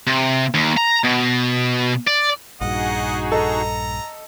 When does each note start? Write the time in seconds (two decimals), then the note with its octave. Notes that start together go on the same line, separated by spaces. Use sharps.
0.07 C3
0.54 D#2
0.77 A#5
1.04 B2
2.07 D5
2.61 A#1 G2 D#4 F#4 G#4 D#5 F#5
3.32 A4 D#5 A#5